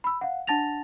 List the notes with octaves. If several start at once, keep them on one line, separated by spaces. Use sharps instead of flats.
B5 E6
F5 F#5
D4 F#5 A5 A6 A#6 F7